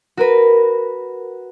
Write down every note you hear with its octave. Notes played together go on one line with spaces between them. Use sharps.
F#4 A#4 B4